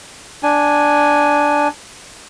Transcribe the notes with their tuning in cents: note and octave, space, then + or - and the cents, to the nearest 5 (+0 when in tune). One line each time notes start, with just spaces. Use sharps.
D4 +0 G#5 +0